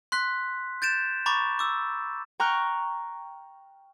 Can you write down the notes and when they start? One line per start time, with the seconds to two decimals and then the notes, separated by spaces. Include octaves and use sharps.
0.12 C6 F#6 B6
0.82 G6 A6 D7 E7
1.26 A#5 B5 C#6 D6 A6
1.59 D6 E6
2.40 G5 A#5 C#6 F6 F#6